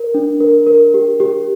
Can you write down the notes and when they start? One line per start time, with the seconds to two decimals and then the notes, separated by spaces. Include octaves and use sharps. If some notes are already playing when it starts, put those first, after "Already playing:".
Already playing: A#4
0.14 D4
0.40 A#4
0.67 A#4
0.94 G4
1.20 G4